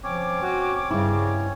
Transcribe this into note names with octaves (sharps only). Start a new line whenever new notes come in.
F3 C4 C#4 C#5 D6
F#4
G2 C#3 E4